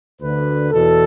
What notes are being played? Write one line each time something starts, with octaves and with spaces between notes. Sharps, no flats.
D2 D3 B4
E2 B2 A4